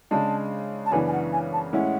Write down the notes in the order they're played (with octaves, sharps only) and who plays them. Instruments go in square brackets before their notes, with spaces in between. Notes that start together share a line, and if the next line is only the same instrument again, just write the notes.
[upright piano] C#3 G#3 D4 [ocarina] A5
[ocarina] A5
[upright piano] F#2 C#3 E3 B3 D4 [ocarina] G#5
[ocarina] G#5
F#5
G#5
A5
[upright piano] A2 G#3 C#4 E4 [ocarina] F#5